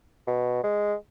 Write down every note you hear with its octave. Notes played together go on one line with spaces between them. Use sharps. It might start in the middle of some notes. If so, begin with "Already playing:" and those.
B2
G#3